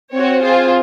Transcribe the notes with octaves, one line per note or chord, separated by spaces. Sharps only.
C4 F#4 C#5
C4 F4 G#4 C5